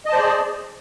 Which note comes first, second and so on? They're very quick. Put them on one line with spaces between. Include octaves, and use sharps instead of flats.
D#5 A5 C5 D5 G#4